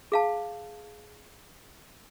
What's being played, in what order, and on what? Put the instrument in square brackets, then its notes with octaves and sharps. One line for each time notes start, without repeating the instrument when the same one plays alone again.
[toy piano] G#4 F5 A5